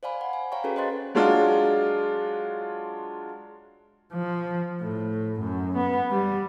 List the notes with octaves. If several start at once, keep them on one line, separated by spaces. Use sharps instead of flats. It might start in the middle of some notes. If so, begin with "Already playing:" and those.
C5 D5 F5 G#5 B5
F#5
G#5
C#5 F5 G5 A#5 C#6
C#4 F#4 G#4 A4 B4 C#5
C5 D#5 F5 C6 F#6 A6
F#3 G#3 D4 F4
F3
A2
F#2
B3
G3